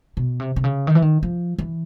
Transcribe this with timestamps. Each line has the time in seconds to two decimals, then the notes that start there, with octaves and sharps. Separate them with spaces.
0.17 B2
0.40 C3
0.56 C3
0.64 C#3
0.87 D#3
0.95 E3
1.02 D#3
1.23 F3
1.59 E3